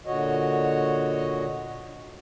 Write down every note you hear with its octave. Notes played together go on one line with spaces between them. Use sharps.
A#2 D3 F#4 C#5 D#5